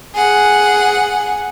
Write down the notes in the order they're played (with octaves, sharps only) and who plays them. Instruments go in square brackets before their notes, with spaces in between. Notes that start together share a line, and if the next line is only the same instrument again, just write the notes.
[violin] G#4 F#5